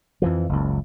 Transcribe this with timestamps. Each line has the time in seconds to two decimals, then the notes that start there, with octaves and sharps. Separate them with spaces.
0.22 F2 E3 F3
0.49 F#1 C#2